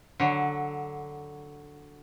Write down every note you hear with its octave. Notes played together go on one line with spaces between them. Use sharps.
D3 F#3